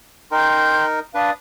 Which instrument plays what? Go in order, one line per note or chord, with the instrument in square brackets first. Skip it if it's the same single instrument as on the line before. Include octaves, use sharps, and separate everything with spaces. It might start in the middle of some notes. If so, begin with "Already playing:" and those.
[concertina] D#4 A#4 [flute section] G5 C6 G6
[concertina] D4 B4 [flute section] D5 F5 D#6